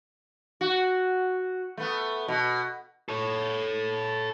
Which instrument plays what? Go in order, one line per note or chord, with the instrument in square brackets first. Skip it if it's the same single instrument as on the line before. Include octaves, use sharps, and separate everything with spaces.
[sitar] F#4
A3 B3
B2
[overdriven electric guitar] A4 C#5